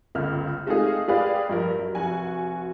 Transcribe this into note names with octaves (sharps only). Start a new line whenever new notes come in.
G1 C#2 C#3 A3 F6
G#3 A3 C4 D#4 F4 G#4
F4 G4 G#4 B4 D5 F5
G2 F3 A#4
F#2
F1 F#4 G#5